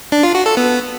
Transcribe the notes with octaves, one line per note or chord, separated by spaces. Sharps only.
D4
F4
F#4
A4
B3